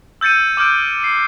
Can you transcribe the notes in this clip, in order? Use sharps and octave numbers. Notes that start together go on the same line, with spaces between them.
E6 G6 A6 C#7 D#7
D6 E6 F6 G6 D7
C7